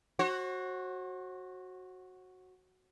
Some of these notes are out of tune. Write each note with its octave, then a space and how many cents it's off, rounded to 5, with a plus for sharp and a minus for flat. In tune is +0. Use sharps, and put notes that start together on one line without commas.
F#4 +0 C5 +45